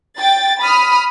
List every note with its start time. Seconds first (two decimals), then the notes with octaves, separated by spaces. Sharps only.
0.17 G5 A6
0.60 B5 D#6 F6